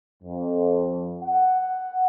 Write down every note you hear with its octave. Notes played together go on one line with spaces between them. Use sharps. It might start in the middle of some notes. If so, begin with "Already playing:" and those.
F2
F#5